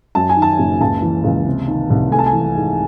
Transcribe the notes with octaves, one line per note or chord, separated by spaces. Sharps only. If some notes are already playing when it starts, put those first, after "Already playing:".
F#2 A5
G#5
D#3
A5
F#1
C#2 A5
E3
C#2
C3
D#3
C2
A3 G#5
A5
G#5
E3
G#2